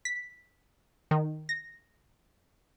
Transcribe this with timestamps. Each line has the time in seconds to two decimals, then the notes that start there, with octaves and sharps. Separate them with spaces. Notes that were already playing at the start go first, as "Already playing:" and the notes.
0.05 B6
1.11 D#3
1.49 A#6